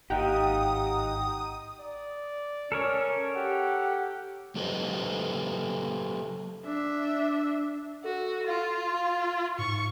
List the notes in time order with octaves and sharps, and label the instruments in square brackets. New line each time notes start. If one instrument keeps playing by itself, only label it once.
[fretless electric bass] G#1 [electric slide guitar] D#4 G4 [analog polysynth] F#5 G5 A#5 [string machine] D#6
[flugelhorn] D5
[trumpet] C#4 [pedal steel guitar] A4 A#4 C#5
[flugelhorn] G4 [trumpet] F#5
[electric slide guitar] F#3 G4 A4 B4 C5 D#5
[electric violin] D4 E5
[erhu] F#4 [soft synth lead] A4
[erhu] F4 [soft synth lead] F5
[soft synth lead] G#2 [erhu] C#6